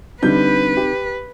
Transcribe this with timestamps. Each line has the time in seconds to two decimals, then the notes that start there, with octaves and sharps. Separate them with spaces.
0.23 D3 G3 C4 D#4 B4 G6
0.77 G4